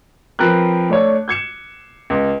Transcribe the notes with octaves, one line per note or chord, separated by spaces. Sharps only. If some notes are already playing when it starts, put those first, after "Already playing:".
F3 C4 A#4 B4 F#6
A3 D4 C#5
G6 G#6 C#7 E7
C#2